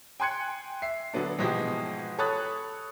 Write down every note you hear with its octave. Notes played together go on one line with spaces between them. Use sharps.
G5 G#5 C6 F#6 G#6 C#7
E5 C7
D3 F#3 B3 D4
G#2 B2 E3 F3 G#3 G4
A4 C#5 B5 D#6 F#6 A6